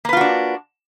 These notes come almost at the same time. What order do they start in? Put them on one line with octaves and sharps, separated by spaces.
A#3 B4 F4 F#4 D4